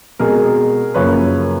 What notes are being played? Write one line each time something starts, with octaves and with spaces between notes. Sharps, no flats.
B2 G#3 C4 G#4 A#4
F#2 C#3 F3 A#3 B4 C#5